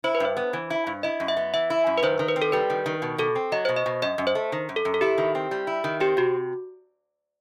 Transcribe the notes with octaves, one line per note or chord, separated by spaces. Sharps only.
E4 C5
B4
G2 C5
B3
E3
E4
G2
E4 D#5
F#2
E5
B3
E3 E5
E4
F#2
B4
D#3 C5
D#3
B4
C4
A4
G3 B4
D#3
D#3
B2
B2 A4
C4
F#3 D#5
B2 C5
D#5
B2
F#2 D#5
F#2
C5
A3
D#3
F#2
A4
F#2
A4
E4 G4
D#3
C4
G3
E4
D#3
C4 G4
C3 F#4